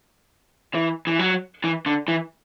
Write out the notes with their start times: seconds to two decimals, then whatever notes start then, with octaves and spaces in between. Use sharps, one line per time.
0.75 E3
1.07 E3
1.19 F#3
1.64 E3
1.86 D3
2.08 E3